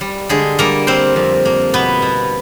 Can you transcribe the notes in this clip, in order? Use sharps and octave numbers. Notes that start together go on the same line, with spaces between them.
G3
D3 G#3 G#4
G3 A#3 A#4
A#3 C4 C5
F2
A#3
B2 B3 B4
B2